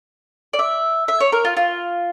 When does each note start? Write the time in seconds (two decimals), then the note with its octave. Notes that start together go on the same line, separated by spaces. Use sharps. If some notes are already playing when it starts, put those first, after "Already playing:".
0.53 D5
0.59 E5
1.08 E5
1.21 C#5
1.32 A#4
1.45 F4
1.57 F4